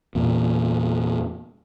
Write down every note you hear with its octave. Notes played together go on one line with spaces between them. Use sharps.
E2 A#2